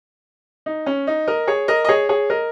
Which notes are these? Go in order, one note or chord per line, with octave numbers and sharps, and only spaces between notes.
D#4
C#4
D#4
A#4 D#5
G#4 C#5
A#4 D#5
D#5
G#4 C#5
G#4 C#5
A#4 D#5